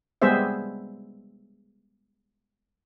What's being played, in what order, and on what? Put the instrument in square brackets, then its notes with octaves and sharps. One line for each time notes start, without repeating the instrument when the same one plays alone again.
[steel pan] G3 G#3 B3 G#4 C5 E5